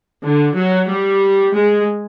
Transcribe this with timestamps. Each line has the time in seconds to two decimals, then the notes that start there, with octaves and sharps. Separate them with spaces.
0.23 D3
0.55 F#3
0.88 G3
1.53 G#3